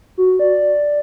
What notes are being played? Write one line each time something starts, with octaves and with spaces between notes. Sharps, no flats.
F#4
D5